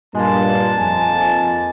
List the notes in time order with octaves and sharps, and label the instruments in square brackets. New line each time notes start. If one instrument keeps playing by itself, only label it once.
[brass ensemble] G2 A#2 [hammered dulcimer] G#3 A#3 [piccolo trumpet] A5
[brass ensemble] F2 G#5